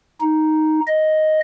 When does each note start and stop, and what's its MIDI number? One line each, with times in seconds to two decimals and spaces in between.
0.21 0.80 63
0.87 1.40 75